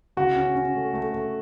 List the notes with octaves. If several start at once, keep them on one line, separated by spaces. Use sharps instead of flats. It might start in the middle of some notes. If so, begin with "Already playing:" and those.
C#3 F#4
C#4
C#4
A3
A3
A3